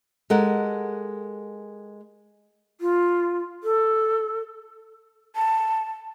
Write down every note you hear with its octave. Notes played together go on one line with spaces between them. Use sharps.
G#3 G4 A4 A#4 F#5
F4
A4
A5